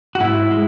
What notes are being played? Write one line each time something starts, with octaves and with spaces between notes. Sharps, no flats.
F#4
G#2 E4
G#3